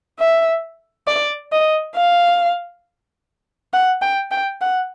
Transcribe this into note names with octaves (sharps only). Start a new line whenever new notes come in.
E5
D5
D#5
F5
F#5
G5
G5
F#5